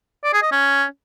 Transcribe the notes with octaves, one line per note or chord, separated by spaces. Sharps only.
D5
G#4
D#5
C#4